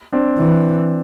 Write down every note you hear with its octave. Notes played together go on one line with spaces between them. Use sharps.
C4 D4
E3